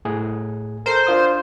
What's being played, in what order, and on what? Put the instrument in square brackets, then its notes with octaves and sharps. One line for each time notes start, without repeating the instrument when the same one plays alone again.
[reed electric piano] A2 G#4
[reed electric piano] A4 A#4 [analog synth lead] C5
[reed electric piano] D4 F4 D#6